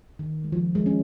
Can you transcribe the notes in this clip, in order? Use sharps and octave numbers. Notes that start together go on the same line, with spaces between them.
D#3
G#3
F3
G#3
C#4